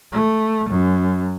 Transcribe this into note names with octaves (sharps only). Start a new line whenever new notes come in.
A3
F#2